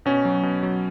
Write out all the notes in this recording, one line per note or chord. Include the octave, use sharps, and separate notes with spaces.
B2 C#4
F#3
B2
F#3